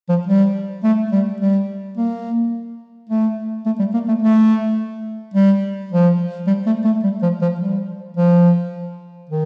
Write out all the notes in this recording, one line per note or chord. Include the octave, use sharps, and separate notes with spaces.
F3
G3
A3
G3
G3
A#3
A3
A3
G3
A#3
A3
A3
G3
F3
G3
A3
A3
G3
F3
F3
G3
F3
D#3